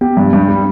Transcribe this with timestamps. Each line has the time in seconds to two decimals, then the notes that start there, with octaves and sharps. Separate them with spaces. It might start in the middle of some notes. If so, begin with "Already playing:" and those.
0.01 B3 G4
0.17 G2
0.33 G2 D4
0.48 G3